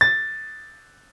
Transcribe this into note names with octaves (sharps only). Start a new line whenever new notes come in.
A6